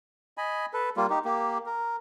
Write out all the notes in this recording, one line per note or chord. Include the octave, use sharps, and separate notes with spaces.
D#5 G#5 B5
A4 B4
G3 A#3 F4
D#4 G4
A#3 G4
A#4